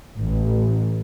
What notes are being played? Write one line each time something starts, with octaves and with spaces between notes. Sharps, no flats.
A1